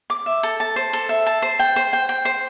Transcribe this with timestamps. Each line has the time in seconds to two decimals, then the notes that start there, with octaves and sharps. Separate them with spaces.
0.10 D6
0.26 E5
0.43 A4
0.60 A5
0.76 C5
0.93 A4
1.09 E5
1.26 A5
1.42 C5
1.59 G5
1.76 C5
1.93 G5
2.09 G5
2.25 C5